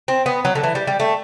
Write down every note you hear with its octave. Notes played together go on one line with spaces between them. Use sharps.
C4
B3
F#3
D3
E3
G3
G3
A3